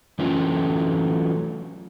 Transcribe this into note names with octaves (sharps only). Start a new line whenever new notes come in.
E3 F#3 A3 C#4 F4